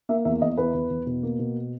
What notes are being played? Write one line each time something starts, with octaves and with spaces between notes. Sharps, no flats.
A#3 E5
E2 E5
E2 D#5
E2 B4
E2
E2
B2
A#3
B2